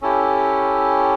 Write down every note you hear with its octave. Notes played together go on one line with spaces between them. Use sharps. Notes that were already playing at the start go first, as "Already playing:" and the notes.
C#4 E4 G4 A4